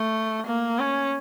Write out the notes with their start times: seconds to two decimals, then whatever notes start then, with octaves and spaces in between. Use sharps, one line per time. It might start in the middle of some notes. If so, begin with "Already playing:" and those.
Already playing: A3
0.47 A#3
0.79 C#4